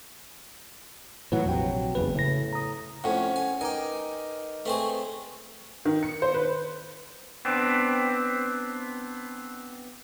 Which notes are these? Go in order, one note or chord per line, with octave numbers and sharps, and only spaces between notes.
A2 E3 F#3 B4 F#5
A#1 F2 C3 F#3 G5
F#1 E2 C#3 B4
A2 C#3 A#6
A#5 D#6
F2 A2 C#4 C5 F#5
G#5
D#4 A#4 B4 D#5 G5 G#5 A#5 D6
A3 C4 G#4 B4 C#6
D#3
C#7
C5
B4
B3 C4 D4